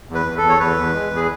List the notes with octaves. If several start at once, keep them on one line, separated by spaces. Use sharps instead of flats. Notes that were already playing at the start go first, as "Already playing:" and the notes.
E2
B4
E2
E2 A4
C#5
E2 B4
E2
G#3
E2
G#4